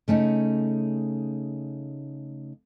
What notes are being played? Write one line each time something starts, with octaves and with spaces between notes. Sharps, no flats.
C#3 A3 C#4 D#4